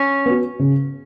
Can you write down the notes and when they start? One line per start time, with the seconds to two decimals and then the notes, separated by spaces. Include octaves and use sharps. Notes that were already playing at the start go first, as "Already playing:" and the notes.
Already playing: C#4
0.26 B3 F#4
0.59 C#3